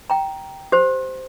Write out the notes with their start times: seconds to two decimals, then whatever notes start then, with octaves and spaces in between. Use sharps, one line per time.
0.10 G5 A#5
0.72 G4 C5